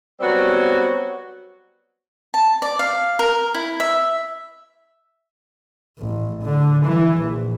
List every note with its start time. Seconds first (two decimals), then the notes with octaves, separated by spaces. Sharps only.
0.20 F#3 G3 B3 C4 F#4
2.34 A5
2.62 D5
2.79 F5
3.19 A#4
3.54 E4
3.80 E5
5.99 A1
6.42 D3
6.85 E3
7.18 A#1